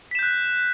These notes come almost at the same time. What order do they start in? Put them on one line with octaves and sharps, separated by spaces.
B6 E7 G6 F#6